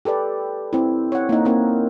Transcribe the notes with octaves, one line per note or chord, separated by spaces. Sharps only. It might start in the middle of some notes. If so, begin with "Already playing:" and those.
G4 A4 B4 D5
C4 E4
C#5 F#5
A#3 D#4
A#3 C4 D#4 A#4